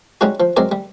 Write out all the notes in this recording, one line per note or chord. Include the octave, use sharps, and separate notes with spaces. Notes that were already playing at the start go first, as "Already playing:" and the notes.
G3 G#3 C#4 D#4 F#4
F3
F#3 G#3 C4 A#4 D5
G3